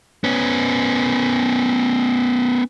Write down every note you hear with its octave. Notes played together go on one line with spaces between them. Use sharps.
B3 C#4